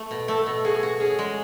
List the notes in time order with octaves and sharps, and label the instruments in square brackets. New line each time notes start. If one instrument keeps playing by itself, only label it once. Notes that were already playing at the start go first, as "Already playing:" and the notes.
Already playing: [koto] A3
B2
[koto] A3 [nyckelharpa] A4
[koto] B2
[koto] F#4 [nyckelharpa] G#4
[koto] F#4
[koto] C#4 [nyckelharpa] G#4
[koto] G#3